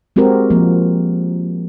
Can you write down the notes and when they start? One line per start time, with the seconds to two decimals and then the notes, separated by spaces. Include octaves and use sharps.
0.16 G#3 C4 F#4 G4 A#4
0.50 F3 A#3